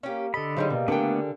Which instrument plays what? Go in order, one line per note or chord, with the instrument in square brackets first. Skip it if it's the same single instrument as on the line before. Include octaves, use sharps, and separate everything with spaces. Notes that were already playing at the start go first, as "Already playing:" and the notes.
[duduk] A#3 [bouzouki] C#4 G4
[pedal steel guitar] D3 B5 [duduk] A4 [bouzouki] D#5
[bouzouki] C#3 E3 G3 [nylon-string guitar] F#3 D#4 G#4 [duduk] C5
[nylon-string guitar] B2 [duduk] A#3
[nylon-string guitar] D3 A#4 G5 [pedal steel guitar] A3 B3 D4